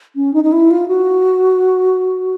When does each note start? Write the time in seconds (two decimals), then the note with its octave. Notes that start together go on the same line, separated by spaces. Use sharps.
0.16 C#4
0.34 D#4
0.44 D#4
0.52 E4
0.71 F4
0.88 F#4